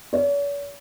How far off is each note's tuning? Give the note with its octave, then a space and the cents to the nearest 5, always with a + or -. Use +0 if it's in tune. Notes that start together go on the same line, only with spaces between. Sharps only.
C#5 +45